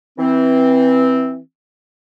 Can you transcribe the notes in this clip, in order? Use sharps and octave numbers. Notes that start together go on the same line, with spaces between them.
E3 C4